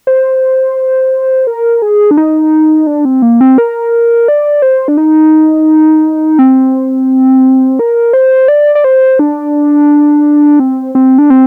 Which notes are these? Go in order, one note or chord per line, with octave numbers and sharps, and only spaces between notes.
C5
A#4
G#4
D4
D#4
D4
C4
A#3
C4
A#4
D5
C5
D4
D#4
C4
A#4
C5
D5
D5
C5
D4
C4
C4
D4
C4